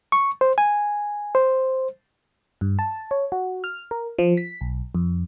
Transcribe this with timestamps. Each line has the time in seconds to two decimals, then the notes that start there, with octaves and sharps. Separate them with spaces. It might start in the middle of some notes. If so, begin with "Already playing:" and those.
0.12 C#6
0.41 C5
0.58 G#5
1.35 C5
2.61 G2
2.79 A5
3.11 C#5
3.32 F#4
3.64 F6
3.91 A#4
4.19 F3
4.37 B6
4.61 B1
4.95 F2